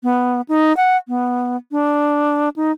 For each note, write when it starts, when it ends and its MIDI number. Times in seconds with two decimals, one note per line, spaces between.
0.03 0.41 59
0.49 0.75 63
0.77 0.97 78
1.08 1.57 59
1.71 2.49 62
2.56 2.72 63